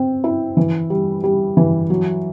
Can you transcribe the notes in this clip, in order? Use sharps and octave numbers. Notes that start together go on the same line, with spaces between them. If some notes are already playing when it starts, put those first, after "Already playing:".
Already playing: C4
E4
E3
G3
G3
E3
F#3